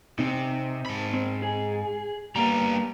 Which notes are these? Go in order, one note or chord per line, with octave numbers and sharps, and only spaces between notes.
C3 C4 D#4
G#2 B5
C4
G#4
G3 A#3 B3 A#5